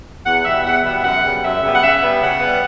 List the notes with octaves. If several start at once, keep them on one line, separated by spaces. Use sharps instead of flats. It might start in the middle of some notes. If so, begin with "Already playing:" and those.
E2 F#5
B2 G3 B3 E5
E2 F#5
B2 G3 B3 E5
F#2 F#5
C#3 G3 B3
F#2 E5
C#3 G3 B3
F#5
C#3 E5
G3 B3
C#3 F#5
G3 B3